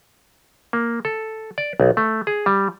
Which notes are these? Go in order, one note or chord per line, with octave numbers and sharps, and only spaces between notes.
A#3
A4
D5
B1
A3
G#4
G3